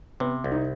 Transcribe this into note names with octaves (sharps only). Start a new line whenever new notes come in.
C3 B3
C2
D#4